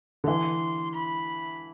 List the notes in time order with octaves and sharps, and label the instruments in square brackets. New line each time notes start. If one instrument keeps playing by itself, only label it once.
[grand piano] D3
[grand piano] E3 [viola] C6
[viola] B5